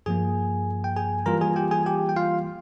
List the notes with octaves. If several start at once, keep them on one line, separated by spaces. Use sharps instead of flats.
G2 F3 A#3 G#4 G#5
G5
G#4 G#5
E3 G3 A#3 F4 A#4 A#5
G#4 G#5
G4 G5
G#4 G#5
G4 G5
G5
F4 F5